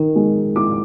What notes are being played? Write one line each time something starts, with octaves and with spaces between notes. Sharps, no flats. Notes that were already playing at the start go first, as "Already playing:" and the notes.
Already playing: D#3
G#3
E4 D6